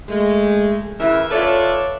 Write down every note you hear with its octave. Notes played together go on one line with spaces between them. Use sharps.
G#3 A3
C#3 E3 A#4 E5
F4 A4 B4 C#5 D5 E5